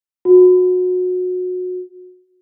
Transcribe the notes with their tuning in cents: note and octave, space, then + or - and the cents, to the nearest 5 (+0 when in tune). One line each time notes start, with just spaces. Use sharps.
F#4 -25